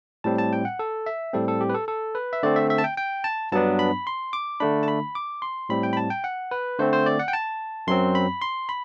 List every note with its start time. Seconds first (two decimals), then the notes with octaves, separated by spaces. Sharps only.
0.24 A2 G3 C4 A5
0.38 A5
0.53 G5
0.65 F#5
0.79 A4
1.06 E5
1.33 A2 G3 C4 A4
1.48 A4
1.61 G4
1.69 B4
1.74 A4
1.88 A4
2.15 B4
2.33 E5
2.43 D3 A3 C4 D5
2.56 E5
2.70 E5
2.78 A5
2.84 G5
2.97 G5
3.24 A5
3.52 G2 F#3 B3 D4 A5
3.79 B5
4.07 C6
4.33 D6
4.60 D3 A3 D4 B5
4.83 A5
4.88 B5
5.15 D6
5.42 C6
5.69 A2 G3 C4 B5
5.83 G5
5.93 B5
5.97 A5
6.10 G5
6.24 F#5
6.51 B4
6.79 D3 A3 C4 C5
6.93 C5
7.06 D5
7.19 F#5
7.28 G5
7.33 A5
7.87 F#2 F#3 C4 C6
8.15 B5
8.41 C6
8.69 B5